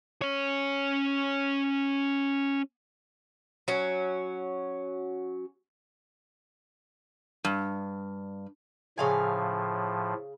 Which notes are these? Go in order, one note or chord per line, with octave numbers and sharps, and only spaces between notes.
C#4 C#5
F#3 C#4
G2
A2 C#3 F3 F5 G#5